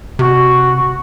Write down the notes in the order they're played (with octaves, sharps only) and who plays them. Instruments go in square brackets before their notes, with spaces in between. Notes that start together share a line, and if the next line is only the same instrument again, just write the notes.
[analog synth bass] C3 [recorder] F#4